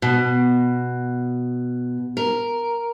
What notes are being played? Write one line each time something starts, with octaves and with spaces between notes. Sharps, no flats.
B2
A#4